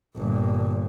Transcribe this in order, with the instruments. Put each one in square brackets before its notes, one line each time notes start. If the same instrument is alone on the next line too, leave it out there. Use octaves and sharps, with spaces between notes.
[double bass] G1 A#2